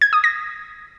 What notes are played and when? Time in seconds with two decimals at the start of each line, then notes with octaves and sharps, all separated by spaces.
0.02 G#6
0.13 D#6
0.24 A#6